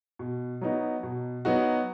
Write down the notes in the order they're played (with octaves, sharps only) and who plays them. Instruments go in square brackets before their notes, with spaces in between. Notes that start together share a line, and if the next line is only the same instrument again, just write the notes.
[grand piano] B2
F#3 B3 D#4 F#4
B2
F#3 B3 D#4 F#4